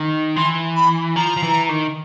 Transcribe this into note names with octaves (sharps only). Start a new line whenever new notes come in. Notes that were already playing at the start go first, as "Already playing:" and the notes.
Already playing: D#3
E3 C6
B5
F3 A#5
F3
E3
D#3